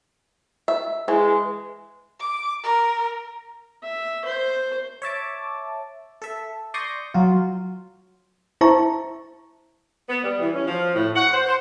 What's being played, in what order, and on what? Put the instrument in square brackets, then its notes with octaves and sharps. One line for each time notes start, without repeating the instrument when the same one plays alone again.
[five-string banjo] E5
[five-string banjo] E3 [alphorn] G#3
[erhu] D6
A#4
[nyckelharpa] E5
C5
[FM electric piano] C#5 E5 A5 D6
A4 E5
D5 C6 C#6 D#6 G6 A#6
F#3 F4
[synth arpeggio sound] E4 C5 E5 A5 A#5 C#6
[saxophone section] B3
G3
E3
C#4
F3
A2
F#5
C5
C5